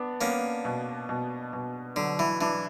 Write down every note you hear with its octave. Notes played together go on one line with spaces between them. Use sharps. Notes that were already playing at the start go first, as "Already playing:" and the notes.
Already playing: B3 D4
A#3 B3 C#4
B2
B2
B2
D3 F#3
E3
E3 D4